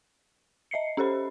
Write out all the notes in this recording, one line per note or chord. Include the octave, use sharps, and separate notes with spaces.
D#5 E5 C7 C#7
C#4 G4 A4 C5 B5